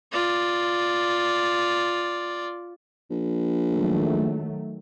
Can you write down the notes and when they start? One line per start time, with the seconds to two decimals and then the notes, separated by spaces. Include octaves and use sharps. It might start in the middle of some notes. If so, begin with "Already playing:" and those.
0.12 F4 D5
3.10 A#1
3.71 D#3 F#3 A3